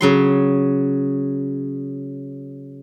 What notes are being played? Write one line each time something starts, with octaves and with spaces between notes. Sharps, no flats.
C#3 F#3 C6